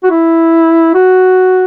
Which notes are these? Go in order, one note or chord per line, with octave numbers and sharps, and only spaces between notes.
F#4
E4
F#4